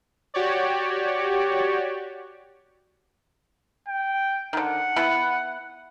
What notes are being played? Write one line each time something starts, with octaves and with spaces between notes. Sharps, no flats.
F#4 G4 C#5 D5
G5
D3 D#3 F#5
B3 E4 B4